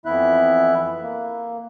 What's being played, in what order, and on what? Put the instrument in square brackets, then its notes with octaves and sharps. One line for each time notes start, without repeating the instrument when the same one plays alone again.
[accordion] F2 E3 B3 E4 E5 F#6
A#3